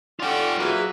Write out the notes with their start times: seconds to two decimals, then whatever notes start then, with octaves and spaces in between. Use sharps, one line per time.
0.20 C#4 F4 A4 D5 F#5 G5
0.57 F#3 A#3 G#4 B4 E5